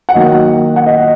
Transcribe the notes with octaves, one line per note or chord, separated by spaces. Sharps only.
F#5
D#3 F#3 A#3 D#5
F#5
D#5